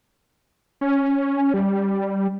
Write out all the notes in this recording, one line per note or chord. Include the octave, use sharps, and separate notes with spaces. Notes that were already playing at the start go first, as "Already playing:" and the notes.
C#4
G3